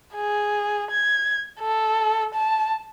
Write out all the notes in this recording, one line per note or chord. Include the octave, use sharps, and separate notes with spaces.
G#4
G#6
A4
A5